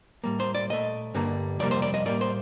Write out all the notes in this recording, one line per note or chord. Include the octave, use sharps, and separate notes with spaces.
A2 G3 A#3
C5
D5
A#2 A3 D#5
G2 D3 G3 A#3
F2 C3 G3 A#3 D5
C5
D5
D#5
A2 G3 A#3 D5
C5